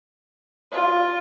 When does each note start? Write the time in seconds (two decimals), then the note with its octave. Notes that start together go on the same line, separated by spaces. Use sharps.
0.72 F4